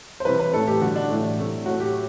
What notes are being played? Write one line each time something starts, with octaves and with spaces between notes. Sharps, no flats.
C5
C3 E3 G3 B4
B4
A2 E3 A3 A4
G4
D3 G3 F#4
D4
A2 E3 A3
C3 F#3 A3
A2 F#3 A3 F#4
G4